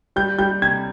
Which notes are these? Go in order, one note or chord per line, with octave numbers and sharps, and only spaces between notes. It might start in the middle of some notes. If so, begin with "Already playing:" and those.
G3 G6
G3 G6
C3 G#6